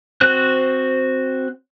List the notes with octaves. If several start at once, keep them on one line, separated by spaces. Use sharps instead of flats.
C4 F#4 C5 F#6